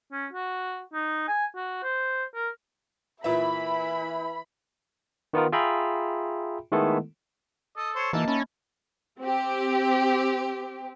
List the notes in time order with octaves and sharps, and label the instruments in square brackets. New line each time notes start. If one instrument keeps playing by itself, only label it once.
[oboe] C#4
F#4
D#4
G#5
F#4
C5
A#4
[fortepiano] A#2 E5 [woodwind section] E3 [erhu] E4 [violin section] B5
[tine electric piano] D#3 B3 D#4 F4 A#4
F4 G#4 E5 G5 A#5 B5
D#3 G#3 A3 B3 E4 A4
[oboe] A4 [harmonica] D#5
[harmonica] C5 C#5
[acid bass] E3 [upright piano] A#3 D#4 [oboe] A4 [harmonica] A5
[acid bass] C#4 [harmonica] E4 [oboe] A5
[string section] C4 G4